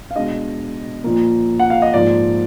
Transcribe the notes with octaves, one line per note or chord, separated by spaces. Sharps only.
F5
B2 G#3 D4 D#5
A#2 F3 A#3
F#5
F5
D#5
G#2 F3 A#3 D5